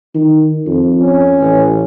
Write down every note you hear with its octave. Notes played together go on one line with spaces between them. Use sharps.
D#3
F2
C#4
A1